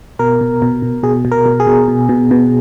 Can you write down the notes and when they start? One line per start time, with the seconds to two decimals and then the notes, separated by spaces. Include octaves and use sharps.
0.19 B2 A#4
0.41 B2
0.62 B2
0.82 B2
1.03 B2 G#4
1.25 B2
1.32 A#4
1.46 B2
1.60 G#4
1.67 B2
1.88 B2
2.09 B2
2.31 B2